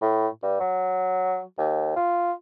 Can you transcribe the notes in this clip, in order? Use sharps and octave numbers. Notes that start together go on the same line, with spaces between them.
A2
G2
F#3
D#2
F4